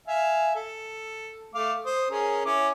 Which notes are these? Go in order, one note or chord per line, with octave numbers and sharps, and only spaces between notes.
E5 F5 G#5
A4
A3 F5 D6
C5 D#6
C#4 G#4 A#4
C#4 E4 D6